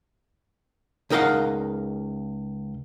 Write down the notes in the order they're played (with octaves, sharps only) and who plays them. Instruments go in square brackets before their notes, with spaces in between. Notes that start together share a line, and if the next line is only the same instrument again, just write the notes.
[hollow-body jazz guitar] C#2 D#4 A#4 D#5 F5 F#5